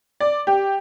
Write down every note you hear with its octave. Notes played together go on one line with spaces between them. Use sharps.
D5
G4